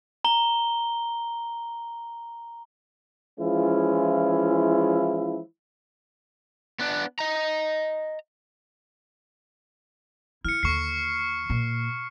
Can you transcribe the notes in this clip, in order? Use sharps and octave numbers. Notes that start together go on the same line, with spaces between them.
A#5 G7
E3 F3 G#3 C#4 E4 F4
B3 D4
D#5 A#5
E4 F6 C#7
D#2 D3 C#6 C7
A#2